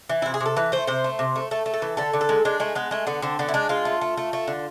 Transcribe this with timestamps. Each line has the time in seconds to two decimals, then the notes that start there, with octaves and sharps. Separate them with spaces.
0.09 E3
0.22 C3 E4
0.34 G#4
0.41 C3
0.46 A4
0.57 E3 B4
0.72 A3 C5
0.87 C3 C5
1.04 A3
1.19 C3
1.36 A3
1.51 A3 A4
1.66 A3
1.74 A4
1.82 E3
1.97 D3 A4
2.13 D3
2.21 A4
2.29 G#3
2.45 G#3 D4
2.60 G#3 A3
2.75 G#3 B3
2.91 G#3 A3
3.07 D3 B3
3.22 D3 C4
3.39 D3 B3
3.49 E4
3.54 G#3 D4
3.69 G#3 F4
3.85 A3
4.01 A3
4.17 A3
4.33 A3
4.48 D3